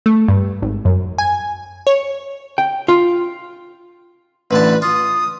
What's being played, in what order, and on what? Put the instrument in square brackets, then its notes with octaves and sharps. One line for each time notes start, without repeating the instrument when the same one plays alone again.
[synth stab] A3
G2
G#1
F#2
G#5
C#5
[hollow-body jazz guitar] G5
F4
[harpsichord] A1 D3 A5 [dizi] B4
[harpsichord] F4 [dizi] D#6